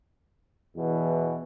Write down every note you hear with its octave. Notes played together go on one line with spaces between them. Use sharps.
E2 B2 E3